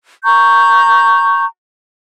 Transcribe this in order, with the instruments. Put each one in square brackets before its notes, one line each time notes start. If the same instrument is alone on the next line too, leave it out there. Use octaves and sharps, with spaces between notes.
[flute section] A#5 C#6 G6